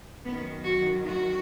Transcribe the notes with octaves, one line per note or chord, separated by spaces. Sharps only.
F#2 D#3 B3
F#4
F#4